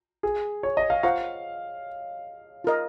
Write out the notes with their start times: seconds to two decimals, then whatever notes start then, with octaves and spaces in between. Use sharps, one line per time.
0.23 G#4
0.63 C#5
0.77 D#5
0.90 F5
1.03 F4 C5 F5 F#5 A#5 C#6
2.64 F4 A#4 D#5